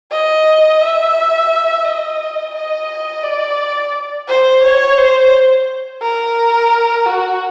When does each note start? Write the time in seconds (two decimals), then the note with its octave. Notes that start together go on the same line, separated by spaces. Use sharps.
0.11 D#5
0.81 E5
1.85 D#5
2.55 D#5
3.23 D5
4.28 C5
4.62 C#5
4.97 C5
6.02 A#4
7.06 F#4